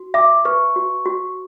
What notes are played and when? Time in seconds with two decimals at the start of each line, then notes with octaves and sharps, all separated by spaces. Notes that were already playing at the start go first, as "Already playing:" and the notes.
Already playing: F#4
0.14 E5 D6
0.45 B4 C#6
0.76 F#4
1.06 F#4